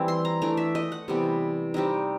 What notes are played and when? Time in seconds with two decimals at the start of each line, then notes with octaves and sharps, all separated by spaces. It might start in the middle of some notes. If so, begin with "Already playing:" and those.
Already playing: E3 G3 C4 E4
0.08 C6
0.25 A#5
0.42 E3 A3 D4 A#5
0.57 E5
0.75 D#5
0.92 F#5
1.08 C3 E3 G3 B3
1.74 G3 C4 D#4